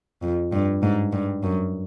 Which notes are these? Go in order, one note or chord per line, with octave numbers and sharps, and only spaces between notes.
F2
G2
G#2
G2
F#2